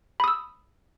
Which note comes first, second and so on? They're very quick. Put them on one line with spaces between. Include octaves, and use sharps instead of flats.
B5 D#6 E6